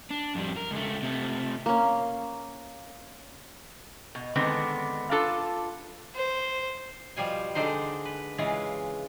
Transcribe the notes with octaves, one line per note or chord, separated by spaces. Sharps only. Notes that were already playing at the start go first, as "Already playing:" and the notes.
D4
F2 G3
A#4
C#2 A3
C3 A3
A#3 C#4
B2
D3 D#3 G#3 B3 C4 F#5
D4 F4 A4 A5
C5
B2 F3 G3 F4 G#5
D3 G#3 D4 D#4 C5
B4
C#3 E3 G#3 F4